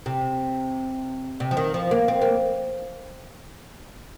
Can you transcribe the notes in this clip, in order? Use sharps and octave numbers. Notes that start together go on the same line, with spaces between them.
C3
C3
F3
D#3
F3
A#3
C4
A#3